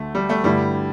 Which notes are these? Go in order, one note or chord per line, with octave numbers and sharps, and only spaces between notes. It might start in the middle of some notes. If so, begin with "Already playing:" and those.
Already playing: D2 D3 A3
G3
A3
G2 D3 G3 A3 E4